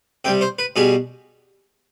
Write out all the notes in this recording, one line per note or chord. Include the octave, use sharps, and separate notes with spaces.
C3 G3 G5
C5
B4
B2 G3 G#4